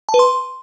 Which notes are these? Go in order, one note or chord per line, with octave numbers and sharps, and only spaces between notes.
A5
B4
C6